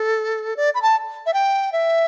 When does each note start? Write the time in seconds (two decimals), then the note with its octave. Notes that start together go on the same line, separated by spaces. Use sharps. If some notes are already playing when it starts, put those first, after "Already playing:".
Already playing: A4
0.57 D5
0.75 B5
0.82 A5
1.26 E5
1.34 G5
1.72 E5